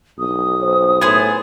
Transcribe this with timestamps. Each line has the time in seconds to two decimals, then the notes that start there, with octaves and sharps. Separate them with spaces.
0.19 B1 D#6
0.62 C5
1.01 A2 B3 G#4 C5